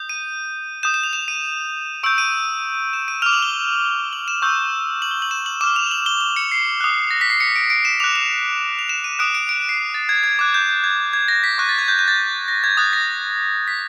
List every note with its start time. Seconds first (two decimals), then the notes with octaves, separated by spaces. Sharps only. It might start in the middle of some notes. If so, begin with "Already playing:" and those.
Already playing: D#6 G6
0.09 D#7
0.83 D#6 G6 E7
0.94 E7
1.03 F7
1.13 E7
1.28 D#7
2.03 C#6 E6 G6 D7
2.18 D#7
2.93 E7
3.08 D#7
3.22 D6 F6 F7
3.33 F#7
3.42 G7
4.13 F#7
4.28 E7
4.42 C#6 E6 G6
5.02 F#7
5.11 G7
5.22 F#7
5.31 E7
5.46 F#7
5.61 D6 E7
5.64 F6
5.76 F7
5.91 F#7
6.06 G7
6.21 G7
6.36 C#7
6.52 C7
6.81 D#6 F#6
7.11 A#6
7.21 B6
7.30 C7
7.40 C#7
7.56 D7
7.70 D7
7.85 E7
8.00 D6 F#6 F7
8.16 F7
8.79 F7
8.89 E7
9.04 D#7
9.19 D#6 F#6 D7
9.35 D7
9.49 D7
9.69 C7
9.94 A6
10.09 G#6
10.24 G#6
10.39 D6 F#6 G#6
10.54 G6
10.69 G6
10.84 G#6
11.13 G#6
11.28 A#6
11.44 B6
11.58 C#6 F#6 A#6
11.69 A6
11.79 G#6
11.88 G6
11.99 G6
12.08 A6
12.48 A#6
12.64 G#6
12.77 D#6 F#6 A6
12.93 A#6
13.68 B6